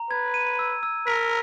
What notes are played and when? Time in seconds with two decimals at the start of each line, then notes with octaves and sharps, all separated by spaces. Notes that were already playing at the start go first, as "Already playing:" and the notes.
Already playing: A#5
0.10 B4 G#6
0.34 D#7
0.59 E6
0.83 E6
1.06 A#4 B6